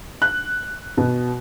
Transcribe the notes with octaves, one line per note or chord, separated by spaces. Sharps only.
F#6
B2